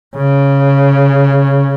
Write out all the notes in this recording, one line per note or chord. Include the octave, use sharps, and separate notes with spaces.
C#3